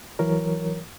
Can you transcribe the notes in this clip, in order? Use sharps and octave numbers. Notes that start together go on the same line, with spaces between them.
E3 F#3 A#4 C#5